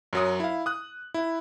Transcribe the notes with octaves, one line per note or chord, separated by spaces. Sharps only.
F#2 F#3 D#6
E4 F5
D#6 F#6
E4